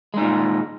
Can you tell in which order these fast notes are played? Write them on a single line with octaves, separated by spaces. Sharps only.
G#3 D#4 A#2